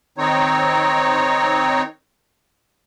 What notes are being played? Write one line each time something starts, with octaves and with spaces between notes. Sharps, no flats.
D#3 C4 D#4 C#5